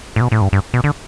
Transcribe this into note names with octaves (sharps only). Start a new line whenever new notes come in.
A2
B2
A2
G2
G2
B2
D3